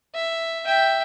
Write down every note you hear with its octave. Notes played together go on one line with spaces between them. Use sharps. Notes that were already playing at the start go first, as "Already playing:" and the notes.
E5
E5 G5